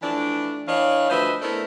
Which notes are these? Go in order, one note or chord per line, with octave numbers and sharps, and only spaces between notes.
E3 F3 A3 D4
E3 D4 C#5 D#5 F5
D2 F3 B4 C5 D#5 E5
A3 B3 C4 D4 E4 A#4